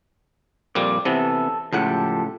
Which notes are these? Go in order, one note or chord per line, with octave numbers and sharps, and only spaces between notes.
F2 A#2 G3 D5
C3 E3 B3 A4 E5
C#2 A2 F3 G4 A4 F#5